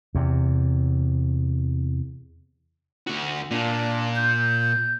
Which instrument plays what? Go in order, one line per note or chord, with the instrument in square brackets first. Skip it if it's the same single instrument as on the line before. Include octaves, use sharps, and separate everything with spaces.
[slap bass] E2 C3
[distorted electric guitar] D2 F#4
[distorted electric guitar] A#2 [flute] D4
[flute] G6